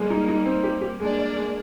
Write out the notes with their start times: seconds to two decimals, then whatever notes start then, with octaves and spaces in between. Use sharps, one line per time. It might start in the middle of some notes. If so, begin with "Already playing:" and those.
Already playing: G3 G#3 A#3
0.10 D#4
0.28 D#4
0.45 C4
0.64 G4
0.81 G4
1.00 G#3 A#3 D4
1.18 D5
1.36 G#3